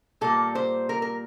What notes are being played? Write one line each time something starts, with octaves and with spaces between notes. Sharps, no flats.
A#2 G3 A#3 A4
C5
A#4
A#4